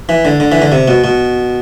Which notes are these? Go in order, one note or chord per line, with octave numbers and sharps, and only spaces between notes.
E3
D3
D3
E3
D3
C3
B2
B2